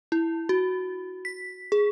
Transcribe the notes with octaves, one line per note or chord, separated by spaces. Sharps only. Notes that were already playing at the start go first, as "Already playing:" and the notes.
E4
F#4
B6
G#4